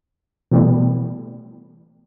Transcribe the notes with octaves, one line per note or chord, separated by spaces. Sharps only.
B2 E3 G3 A3 B3